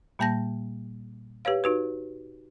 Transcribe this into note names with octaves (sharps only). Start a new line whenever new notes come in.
A#2 G3 A#3 A5 G6 A#6
G4 B4 C#5 F5
D#4 F#4 B4